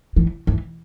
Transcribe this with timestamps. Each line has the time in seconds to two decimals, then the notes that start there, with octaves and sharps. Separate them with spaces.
0.16 E3
0.47 E3